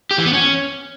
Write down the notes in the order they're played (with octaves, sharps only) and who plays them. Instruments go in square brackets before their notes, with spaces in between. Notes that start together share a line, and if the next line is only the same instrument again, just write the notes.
[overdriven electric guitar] G4
E3
B3
C#4